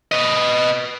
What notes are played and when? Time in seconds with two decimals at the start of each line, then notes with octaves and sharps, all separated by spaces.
0.12 B4 D#5